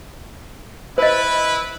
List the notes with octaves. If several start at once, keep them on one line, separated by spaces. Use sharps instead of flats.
E4 B4 C5 D#5